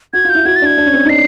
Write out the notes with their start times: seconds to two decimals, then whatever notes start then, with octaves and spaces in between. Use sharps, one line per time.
0.13 F#4 G#6
0.25 F4
0.30 G6
0.35 E4
0.45 F#4 G#6
0.56 A6
0.62 D4 G#6
0.78 D4
0.86 C#4
0.94 C4
1.05 D#4
1.09 D4 C7